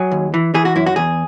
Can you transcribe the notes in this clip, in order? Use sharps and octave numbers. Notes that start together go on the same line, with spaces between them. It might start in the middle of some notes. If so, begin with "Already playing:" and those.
Already playing: F#3 G#4
D#2
E3
E3 G#4
F#4
F#2 E4
F#4
E2 G#4